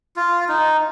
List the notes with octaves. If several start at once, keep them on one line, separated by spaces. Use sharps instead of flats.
F4
D#4